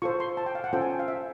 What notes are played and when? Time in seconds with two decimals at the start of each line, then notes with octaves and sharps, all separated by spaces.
0.02 F4 A4 C5 C#6
0.20 C6
0.37 A5
0.46 G5
0.55 F5
0.64 F#5
0.73 C#4 F4 A4 C5 G5
0.81 G#5
0.90 G5
1.00 F5
1.08 E5